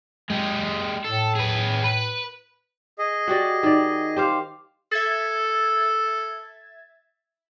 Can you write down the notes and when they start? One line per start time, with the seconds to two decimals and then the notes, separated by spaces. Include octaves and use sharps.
0.30 G#3 G4
1.04 A2 A4
1.35 G#4 B4
1.84 B4
2.98 G#4 D#5
3.28 F#4 G4 D5
3.63 D#3 D5
4.16 G4 C5 F5
4.92 A4 E5 G#6 A6